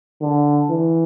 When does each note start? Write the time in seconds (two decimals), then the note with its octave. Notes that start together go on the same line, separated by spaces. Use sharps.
0.22 D3
0.70 E3